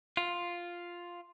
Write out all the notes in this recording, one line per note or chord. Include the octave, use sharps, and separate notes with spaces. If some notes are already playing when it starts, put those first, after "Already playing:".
F4